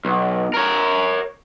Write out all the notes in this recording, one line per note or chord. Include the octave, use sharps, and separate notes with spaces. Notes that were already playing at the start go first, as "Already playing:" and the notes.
B1
A#4 C#5